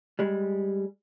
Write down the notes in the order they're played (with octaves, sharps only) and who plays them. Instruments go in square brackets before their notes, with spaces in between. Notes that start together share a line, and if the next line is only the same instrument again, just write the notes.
[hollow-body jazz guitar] G3 G#3